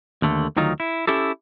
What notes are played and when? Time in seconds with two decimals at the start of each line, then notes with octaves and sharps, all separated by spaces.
0.22 D#2 D3 A3
0.57 D2 D#3 F#3 D#4 F4
0.80 E4
1.07 C#4 E4 G4 A4